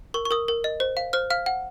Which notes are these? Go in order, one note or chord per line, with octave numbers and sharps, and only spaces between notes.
A#4 C#6
C#6
A#4 D#6
A#4
D#5
C5
F5
C5 F6
F5 F6
F#5